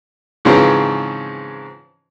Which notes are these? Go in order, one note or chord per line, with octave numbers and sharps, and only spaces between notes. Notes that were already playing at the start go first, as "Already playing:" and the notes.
G#2 C#3 E3 F3 C4 C#4